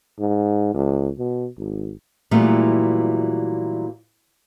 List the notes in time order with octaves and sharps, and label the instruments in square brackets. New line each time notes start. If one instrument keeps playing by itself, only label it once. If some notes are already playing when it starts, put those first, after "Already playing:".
[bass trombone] G#2
C#2
B2
G#1
[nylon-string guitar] A#2 E3 F#3 G3 A3 B3